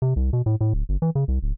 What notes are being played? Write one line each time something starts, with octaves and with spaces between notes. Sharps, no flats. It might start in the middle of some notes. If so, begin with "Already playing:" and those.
C3
C2
B2
A2
A2
D1
G1
E3
C#3
C2
D1